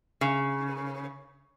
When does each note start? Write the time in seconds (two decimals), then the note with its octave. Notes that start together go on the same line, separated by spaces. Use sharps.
0.21 C#3